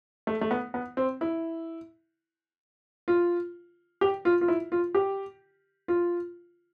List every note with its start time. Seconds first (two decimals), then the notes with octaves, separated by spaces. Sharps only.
0.27 A3
0.41 A3
0.51 B3
0.74 B3
0.97 C4
1.21 E4
3.08 F4
4.01 G4
4.25 F4
4.41 F4
4.48 E4
4.72 F4
4.95 G4
5.88 F4